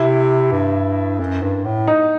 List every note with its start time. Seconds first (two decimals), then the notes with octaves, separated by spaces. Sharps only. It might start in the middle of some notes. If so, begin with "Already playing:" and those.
Already playing: C3 E4
0.52 G2
1.20 F#2
1.43 G2
1.65 A2
1.87 D#4